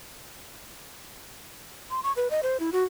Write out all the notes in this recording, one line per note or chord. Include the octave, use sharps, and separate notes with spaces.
C6
C#6
B4
D#5
C5
E4
F#4